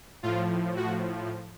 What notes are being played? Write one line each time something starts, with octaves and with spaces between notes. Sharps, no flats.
A2 F3 F4
F#4